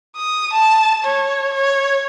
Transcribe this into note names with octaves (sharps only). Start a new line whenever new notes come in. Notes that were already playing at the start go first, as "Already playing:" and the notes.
D#6
A5
C#5
C#5